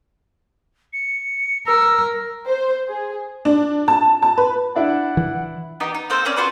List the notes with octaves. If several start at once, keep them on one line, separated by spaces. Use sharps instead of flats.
C#7
A#4 E6
C5
G#4
D4
A5
A5
B4
D4 E4 D5 F#5
E3
B3 D#4 G4 D#5
D#4
A#3 C4 A4 C5
C4 C#4 D5
F4 F#4 A4 B4